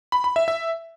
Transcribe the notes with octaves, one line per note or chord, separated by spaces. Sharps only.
B5
B5
E5
E5